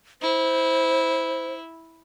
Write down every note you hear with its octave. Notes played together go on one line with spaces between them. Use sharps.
E4 C5